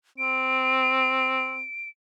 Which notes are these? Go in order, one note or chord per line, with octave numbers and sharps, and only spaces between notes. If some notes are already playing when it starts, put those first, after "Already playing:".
C4 D7